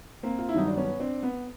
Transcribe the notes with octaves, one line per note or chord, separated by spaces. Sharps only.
A#3 C4
F4
E4
G2 D#3 F#3 D#4
D4
B3 C#4
C4 D4
B3